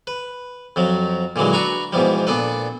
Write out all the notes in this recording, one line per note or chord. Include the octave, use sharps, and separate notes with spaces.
B4
F2 F3 F#3
A#2 D3 E3 F#3 G#3
D4 F#4 B4 A#5 B5 C#6
G#2 B2 E3 F3 G3
A#2 B3 D4 A4 B4